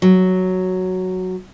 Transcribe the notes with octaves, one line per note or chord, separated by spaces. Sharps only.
F#3